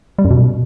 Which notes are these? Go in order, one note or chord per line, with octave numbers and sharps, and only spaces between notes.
G3
F#2
B2